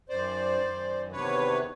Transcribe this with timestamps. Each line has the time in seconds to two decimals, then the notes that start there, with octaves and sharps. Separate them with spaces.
0.09 F#2 D#3 C5 D5
0.61 F#2 D#3
1.12 E2 C3 D#3 B4 C#5